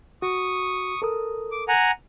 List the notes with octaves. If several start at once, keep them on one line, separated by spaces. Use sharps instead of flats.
F#4 C#6 D#6
A4 A#4 D#6
D6
F#5 G#5 A#5